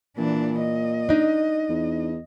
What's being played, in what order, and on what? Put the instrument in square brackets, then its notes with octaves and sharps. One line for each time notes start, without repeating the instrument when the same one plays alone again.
[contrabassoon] A#2 [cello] E3 D4
[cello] D#5
[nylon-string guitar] D4 D#4
[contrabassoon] E2